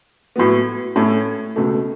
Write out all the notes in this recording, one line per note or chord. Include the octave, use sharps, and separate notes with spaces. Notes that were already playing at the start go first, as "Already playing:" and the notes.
A2 F#3 B3
A2 A3 C#4 A4
C#2 B2 A3